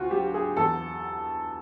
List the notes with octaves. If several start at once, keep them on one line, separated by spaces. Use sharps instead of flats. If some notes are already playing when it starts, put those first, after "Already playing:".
Already playing: D2 F4 F#4
F#3 G4
G#4
E2 A4